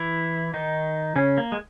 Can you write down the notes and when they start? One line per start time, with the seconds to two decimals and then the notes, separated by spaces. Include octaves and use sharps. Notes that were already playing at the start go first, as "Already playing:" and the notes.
Already playing: E3 E4
0.54 D#3 D#4
1.16 C#3 C#4
1.38 A#3
1.52 G#3